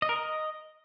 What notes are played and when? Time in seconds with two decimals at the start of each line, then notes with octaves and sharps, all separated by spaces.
0.02 D#5
0.09 A#4
0.16 D#5